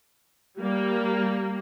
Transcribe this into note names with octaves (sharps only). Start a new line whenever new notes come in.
G3 A#3